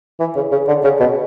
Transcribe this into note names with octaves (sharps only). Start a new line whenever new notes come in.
E3
C#3
C#3
D3
C#3
B2